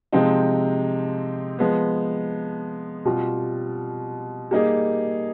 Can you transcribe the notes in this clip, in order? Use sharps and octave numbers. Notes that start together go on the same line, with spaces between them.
C3 F3 G#3 C4 D#4
F3 G#3 B3
B2 G3 C4 F4
G3 A#3 D#4 G#4